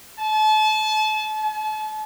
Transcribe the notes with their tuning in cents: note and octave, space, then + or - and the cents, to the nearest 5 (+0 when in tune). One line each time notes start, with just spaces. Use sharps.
A5 -35
A5 -40